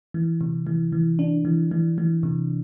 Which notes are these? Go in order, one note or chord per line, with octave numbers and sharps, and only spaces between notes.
E3
C3
E3
E3
D4
E3
E3
E3
C3